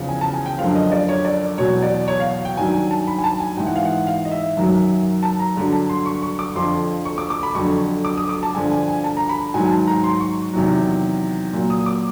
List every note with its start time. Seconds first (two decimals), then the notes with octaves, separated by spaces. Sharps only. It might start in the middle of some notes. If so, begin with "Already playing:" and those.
Already playing: E2 C#3 F3
0.09 G#5
0.21 A5
0.34 G#5
0.46 G5
0.58 F#2 D3 F3 F5
0.75 D#5
0.92 D5
1.09 C#5
1.25 D5
1.58 E2 B2 F#3 C#5
1.82 D5
2.08 C#5
2.20 F5
2.45 G5
2.57 G2 D#3 F#3 G#5
2.74 G#5
2.91 A5
3.07 B5
3.19 G#5
3.24 A5
3.40 G#5
3.57 G#2 E3 G5
3.67 F#5
3.76 F5
3.85 F#5
4.07 F5
4.25 D#5
4.31 E5
4.57 F#2 D#3 F#3
5.23 A5
5.40 A#5
5.56 G2 D3 F#3
5.73 A5
5.89 C6
6.06 C#6
6.22 C#6
6.39 D6
6.55 F2 D3 F3 C6
7.05 C#6
7.18 D6
7.30 D6
7.43 B5
7.55 F2 D3 F#3 C#6
8.05 D6
8.17 D#6
8.29 D6
8.43 A5
8.55 G2 D3 F3 G#5
8.72 G#5
8.88 G#5
9.04 A5
9.17 A#5
9.29 B5
9.54 G#2 D#3 F#3 G#5
9.66 G#5
9.71 A5
9.87 A#5
10.04 C6
10.20 C#6
10.54 E2 C3 D#3 F#3
11.53 A#2 F#3
11.70 D#6
11.86 D6